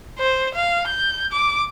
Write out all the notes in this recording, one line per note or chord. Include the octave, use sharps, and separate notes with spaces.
C5
F5
G6
D6